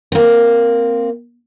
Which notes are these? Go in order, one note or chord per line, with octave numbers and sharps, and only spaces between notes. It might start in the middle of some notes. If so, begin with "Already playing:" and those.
A#3 C4